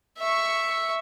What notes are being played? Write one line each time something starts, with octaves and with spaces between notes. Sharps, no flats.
E5 C#6